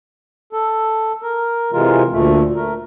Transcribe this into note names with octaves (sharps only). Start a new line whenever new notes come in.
A4
A#4
C3 E3 G#3 F4 A#4
D2 A#2 A3
A3 A#4